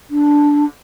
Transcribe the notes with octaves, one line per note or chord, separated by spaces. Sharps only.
D4